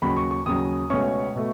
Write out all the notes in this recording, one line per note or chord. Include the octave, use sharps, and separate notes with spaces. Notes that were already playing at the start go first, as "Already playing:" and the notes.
D#2 C#3 F#3 B5
C#6
C#6
D#2 C#3 F#3 D#6
C#2 B2 A3 C#4 C#6
B2 A3